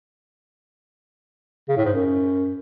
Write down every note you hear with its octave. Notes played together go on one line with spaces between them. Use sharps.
C#3
A2
G#2
F#2